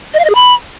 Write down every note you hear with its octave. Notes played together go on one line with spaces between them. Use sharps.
D#5
F5
D#5
G#4
B5